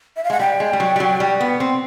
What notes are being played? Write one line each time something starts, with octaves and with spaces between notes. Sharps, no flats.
E5
F5
G#3 F#5
G3 G5
G#3
G3
F#3
G3
F#3
G3
B3
C4